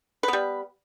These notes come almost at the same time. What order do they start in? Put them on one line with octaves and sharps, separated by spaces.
B4 B3 G3